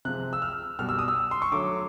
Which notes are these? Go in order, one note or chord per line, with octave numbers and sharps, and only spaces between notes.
C3 F3 G#3 F#6
E6
F6
B2 G3 F6
E6
D#6
E6
C6
C#6
D3 F#3 A3 D6